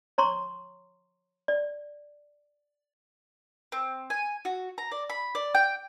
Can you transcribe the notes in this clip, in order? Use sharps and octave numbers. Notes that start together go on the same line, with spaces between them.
C#5 A#5 C6 C#6
D5
C4
G#5
F#4
A#5
D5
B5
D5
G5